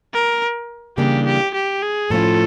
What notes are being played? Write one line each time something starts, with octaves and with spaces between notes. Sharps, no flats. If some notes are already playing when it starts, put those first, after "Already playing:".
A#4
C#3 E3 G3 A#3 D4 G4
G4
G4
G#4
A2 F3 A3 C#4 F4 A4